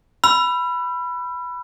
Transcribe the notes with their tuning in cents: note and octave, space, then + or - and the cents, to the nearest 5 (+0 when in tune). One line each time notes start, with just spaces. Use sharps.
B5 +0 E6 +40